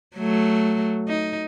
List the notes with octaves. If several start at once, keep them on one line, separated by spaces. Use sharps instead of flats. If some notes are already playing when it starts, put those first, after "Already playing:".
F#3 A3
D#4